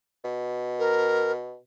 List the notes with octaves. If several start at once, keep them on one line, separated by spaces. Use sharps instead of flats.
B2
A#4